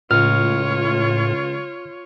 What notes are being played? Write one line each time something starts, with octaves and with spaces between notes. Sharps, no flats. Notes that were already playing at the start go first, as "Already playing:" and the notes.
C#2 A2 F4 C#5 F6